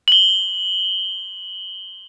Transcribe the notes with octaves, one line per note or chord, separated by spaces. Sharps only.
F#7 G7